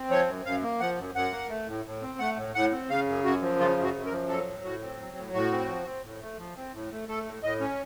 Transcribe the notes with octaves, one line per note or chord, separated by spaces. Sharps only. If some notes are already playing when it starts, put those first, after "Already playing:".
Already playing: C4
F3 C#5
F#2
F#2 F5
A#3
F3 F#5
F#2
F#2 F#5
A#3
A3
A2
A2
C4
A3 F#5
A2
A2 F#5
C4
C#3 F5
F#2
F#2 F#4
F3
C#3 F4
F#2
F#4
F#2
A#4
F3
F#3 A4
A2
A2 F#4
C4
F#3
A2
A2 F#4
C4
F3
C4
A2
A3
F3
C4
A2
A3
A3 A4
A2
A2 D#5
C#4